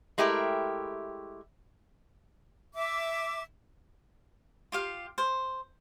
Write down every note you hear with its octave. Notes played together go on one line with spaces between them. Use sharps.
G#3 A3 E4 G4 A#4
E5 D6
F4 G4 F5
C5